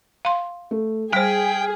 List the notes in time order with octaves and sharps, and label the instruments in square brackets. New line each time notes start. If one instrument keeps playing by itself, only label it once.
[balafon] F5 C6
[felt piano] A3
[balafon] G3 C5 [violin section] G#4 [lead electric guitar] G5 [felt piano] F6 B6